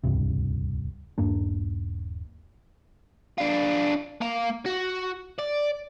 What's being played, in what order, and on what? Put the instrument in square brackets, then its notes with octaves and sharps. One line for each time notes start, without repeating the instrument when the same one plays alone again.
[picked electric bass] D#1 C#2 G2 C3
D#1 G2 A#3 D4
[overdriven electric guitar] D4 F4
A#3 F5
F#4
D5